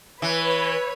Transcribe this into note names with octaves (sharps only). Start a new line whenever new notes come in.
E3 B4 C#5 B5